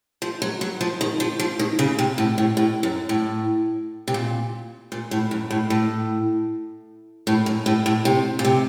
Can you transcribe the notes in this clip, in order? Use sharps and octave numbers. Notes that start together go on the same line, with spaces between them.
F3
F#3
F#3
F3
D#3
F3
F3
D#3
C#3
C3
A2
A2
A2
F#2
A2
C3
A#2
A#2
A2
F#2
A2
A2
A2
F#2
A2
A2
C3
A#2
C3